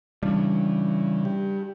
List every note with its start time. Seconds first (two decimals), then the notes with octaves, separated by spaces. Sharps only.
0.23 C#3 E3 G3 D4
1.25 G4